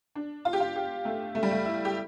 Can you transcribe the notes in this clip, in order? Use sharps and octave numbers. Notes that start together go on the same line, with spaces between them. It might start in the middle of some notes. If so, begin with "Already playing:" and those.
D4
F4
G4
F4
G4
A3
A3
G3
A3
E4
G4